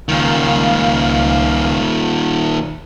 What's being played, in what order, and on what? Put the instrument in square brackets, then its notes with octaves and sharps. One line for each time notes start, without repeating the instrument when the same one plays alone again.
[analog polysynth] C#2 F5 [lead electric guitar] A#2 D#3